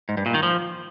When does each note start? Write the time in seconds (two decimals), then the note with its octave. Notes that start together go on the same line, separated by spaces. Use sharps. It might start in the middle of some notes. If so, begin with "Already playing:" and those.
0.09 G#2
0.17 G2
0.26 A#2
0.34 D#3
0.43 F3